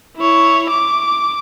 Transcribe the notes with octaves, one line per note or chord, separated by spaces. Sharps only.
E4 C#5
D6